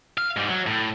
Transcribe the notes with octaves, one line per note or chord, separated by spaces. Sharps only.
F5
G#2 G3
F#3
A2